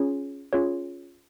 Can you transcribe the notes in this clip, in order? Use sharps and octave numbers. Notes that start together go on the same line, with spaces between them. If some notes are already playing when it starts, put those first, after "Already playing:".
Already playing: C#4 F4 G#4 C#5
C#4 F4 G#4 C#5